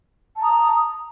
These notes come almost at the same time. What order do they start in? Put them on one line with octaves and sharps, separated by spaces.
A5 A#5 D#6